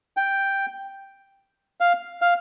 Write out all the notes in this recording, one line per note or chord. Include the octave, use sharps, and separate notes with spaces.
G5
F5
F5